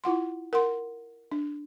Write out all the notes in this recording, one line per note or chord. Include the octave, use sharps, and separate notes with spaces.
E4 F4 F#5 C6
A#4 F#5 C6
D4